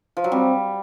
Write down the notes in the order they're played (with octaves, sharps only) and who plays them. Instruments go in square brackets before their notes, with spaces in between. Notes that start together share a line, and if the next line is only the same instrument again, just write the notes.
[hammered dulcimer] F3
F#3
[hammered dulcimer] G3 [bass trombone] C4